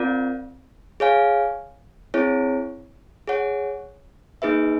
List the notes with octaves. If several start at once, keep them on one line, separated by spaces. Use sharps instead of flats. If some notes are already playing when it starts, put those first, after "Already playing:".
Already playing: C4 F4 A#4 D5
G#4 C#5 F5 G#5
C4 E4 G#4 C#5
G#4 C#5 F#5
A#3 D#4 G#4 B4 E5